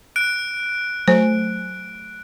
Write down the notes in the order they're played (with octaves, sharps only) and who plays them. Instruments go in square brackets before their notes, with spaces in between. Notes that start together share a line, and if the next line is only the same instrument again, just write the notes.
[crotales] F#6 D7
[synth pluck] F#3 A3 G#5 [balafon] C5